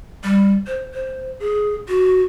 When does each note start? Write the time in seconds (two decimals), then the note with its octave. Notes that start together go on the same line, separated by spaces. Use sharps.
0.24 G3
0.67 C5
0.94 C5
1.40 G#4
1.88 F#4